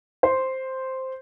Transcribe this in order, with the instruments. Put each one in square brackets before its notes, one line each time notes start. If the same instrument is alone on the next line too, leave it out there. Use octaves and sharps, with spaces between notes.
[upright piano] C5